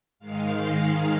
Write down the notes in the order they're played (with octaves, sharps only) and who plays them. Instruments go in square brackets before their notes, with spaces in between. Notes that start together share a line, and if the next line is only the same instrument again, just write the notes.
[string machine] G#2 D#3 G#3 F5